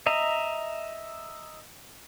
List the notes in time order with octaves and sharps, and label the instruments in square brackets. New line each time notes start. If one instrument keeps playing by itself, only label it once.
[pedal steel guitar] D#5 E5 A#5